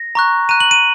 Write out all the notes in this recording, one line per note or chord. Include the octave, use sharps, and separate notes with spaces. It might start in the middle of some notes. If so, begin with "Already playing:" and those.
Already playing: A#6
A#5 C#6 F#6
A#5 F#6 D#7
F#7
D#7